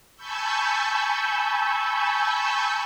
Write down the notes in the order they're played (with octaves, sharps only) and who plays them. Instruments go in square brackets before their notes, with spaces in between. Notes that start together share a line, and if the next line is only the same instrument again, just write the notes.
[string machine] G#5 A5 B5 C#6 E6 G6